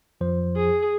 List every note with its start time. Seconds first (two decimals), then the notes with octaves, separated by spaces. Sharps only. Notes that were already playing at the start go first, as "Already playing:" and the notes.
0.21 F2 F3 C5
0.56 G#4